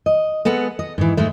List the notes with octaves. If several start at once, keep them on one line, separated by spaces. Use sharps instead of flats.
D#5
G#3 B3 A4 F#5
D#5
G#2 E3
G#2 G#3 A3